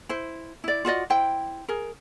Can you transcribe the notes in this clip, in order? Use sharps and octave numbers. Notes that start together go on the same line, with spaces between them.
E4 C5
E4 D5
F4 F#4 D5 D#5
E4 C5 G5
G#4 A#4